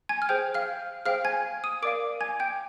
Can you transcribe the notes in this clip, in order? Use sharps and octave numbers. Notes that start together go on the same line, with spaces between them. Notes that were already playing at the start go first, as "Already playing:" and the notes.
G#5 G#6
F6
G#4 C5 G5 G6
F5 F6
G#4 C5 F5 G5 F6
G#5 G#6
D#6 D#7
A#4 D5 F5 D6 D7
G#5 G#6
G5 G6